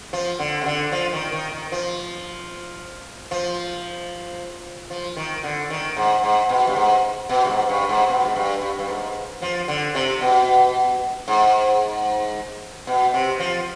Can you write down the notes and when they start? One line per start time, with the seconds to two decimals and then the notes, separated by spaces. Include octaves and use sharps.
0.13 F3
0.39 D3
0.61 C3
0.66 D3
0.92 F3
1.12 D#3
1.32 D#3
1.52 D#3
1.72 F3
3.31 F3
4.90 F3
5.17 D#3
5.43 D3
5.70 D#3
5.97 G#2
6.23 G#2
6.49 B2
6.67 G2
6.76 G#2
7.29 B2
7.45 G2
7.49 G#2
7.69 G2
7.89 G#2
8.09 B2
8.25 G#2
8.36 G2
8.62 G2
8.79 G2
8.88 G#2
9.42 F3
9.68 D3
9.95 C3
10.21 B2
11.28 G#2
12.87 B2
13.14 C3
13.40 F3